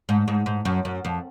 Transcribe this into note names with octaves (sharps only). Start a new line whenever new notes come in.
G#2
G#2
G#2
F#2
F#2
F2